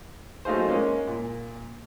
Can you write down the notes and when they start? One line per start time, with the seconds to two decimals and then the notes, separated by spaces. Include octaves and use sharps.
0.45 F#3 A3 D#4 F4 G#4 C5
0.69 G#3 A#3 C#4
1.08 A#2